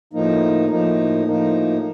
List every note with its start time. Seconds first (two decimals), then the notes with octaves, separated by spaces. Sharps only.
0.13 A2 F3 A#3 D#4
0.69 A2 F3 A#3 D#4
1.25 A2 F3 A#3 D#4